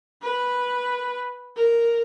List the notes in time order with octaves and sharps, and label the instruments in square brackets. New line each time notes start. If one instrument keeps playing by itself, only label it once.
[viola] B4
A#4